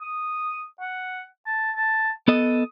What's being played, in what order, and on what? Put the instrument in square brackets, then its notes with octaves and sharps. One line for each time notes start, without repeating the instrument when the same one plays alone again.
[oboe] D#6
F#5
A5
A5
[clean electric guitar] B3 A4 D#5 [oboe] D#6